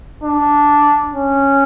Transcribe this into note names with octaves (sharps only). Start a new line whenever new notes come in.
D4
C#4